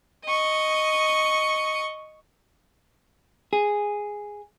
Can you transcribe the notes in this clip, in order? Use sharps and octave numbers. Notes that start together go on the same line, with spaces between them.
D#5 C#6
G#4